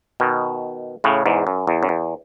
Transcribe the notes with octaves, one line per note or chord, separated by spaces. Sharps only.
B2 D#3
A2 C#3
E2 G#2
F#2
E2
F#2
E2